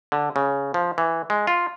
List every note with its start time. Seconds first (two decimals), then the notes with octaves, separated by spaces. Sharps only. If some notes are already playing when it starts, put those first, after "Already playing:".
0.12 D3
0.36 C#3
0.74 F3
0.98 E3
1.30 G#3
1.47 F4